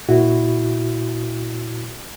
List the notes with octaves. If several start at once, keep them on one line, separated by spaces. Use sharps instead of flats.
A#2 E4 F#4